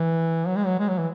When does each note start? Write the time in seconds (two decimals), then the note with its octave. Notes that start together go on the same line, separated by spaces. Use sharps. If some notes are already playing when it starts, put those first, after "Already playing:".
Already playing: E3
0.47 F#3
0.56 G#3
0.66 F#3
0.79 G#3
0.89 F#3
0.99 E3